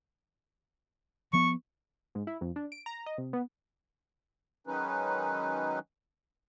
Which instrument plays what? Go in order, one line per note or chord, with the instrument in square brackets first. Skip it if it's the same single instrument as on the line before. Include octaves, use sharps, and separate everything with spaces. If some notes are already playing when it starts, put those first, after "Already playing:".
[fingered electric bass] F3 B3 [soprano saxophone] C#6
[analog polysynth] G#2
E4
F2
D4
D7
A#5
D#5
C3
B3
[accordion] D#3 F#3 G#3 C#4 D#4 B4